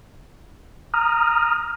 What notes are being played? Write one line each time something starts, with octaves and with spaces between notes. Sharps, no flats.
A#5 D#6 F6